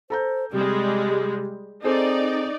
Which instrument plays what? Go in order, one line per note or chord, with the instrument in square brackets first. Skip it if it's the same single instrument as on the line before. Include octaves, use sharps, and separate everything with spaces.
[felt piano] A4 A#5 G6 [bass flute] C5
[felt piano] C3 [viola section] G3 G#3 [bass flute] G4
[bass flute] C4 [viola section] D#4 D5 [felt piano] G#4 A4 C5